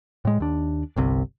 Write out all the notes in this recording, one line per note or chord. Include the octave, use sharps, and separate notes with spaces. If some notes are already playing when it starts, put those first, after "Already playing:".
A2 G#3
D#2 D4
G1 C2 C3